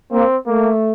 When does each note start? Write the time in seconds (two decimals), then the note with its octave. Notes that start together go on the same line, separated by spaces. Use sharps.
0.12 A#3 C4
0.47 A3 A#3